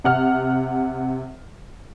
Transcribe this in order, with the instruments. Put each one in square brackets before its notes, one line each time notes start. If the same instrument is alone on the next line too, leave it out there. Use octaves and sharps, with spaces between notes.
[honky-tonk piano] C3 F#5 F6